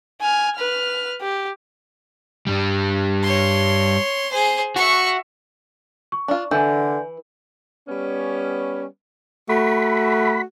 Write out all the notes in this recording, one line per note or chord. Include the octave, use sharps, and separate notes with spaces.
G#5 F6
B4 F6
G4
G2 G3
C#5 C6
G#4 C5
F#4 E5 C#6
C#6
D4 F4
D3 E3 G#5 G6
G3 B3 C#4
A3 F#4 B5